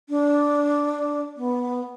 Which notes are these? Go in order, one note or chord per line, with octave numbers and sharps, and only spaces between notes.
D4
B3